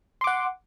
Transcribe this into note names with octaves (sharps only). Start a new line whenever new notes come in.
F#5 C6 D6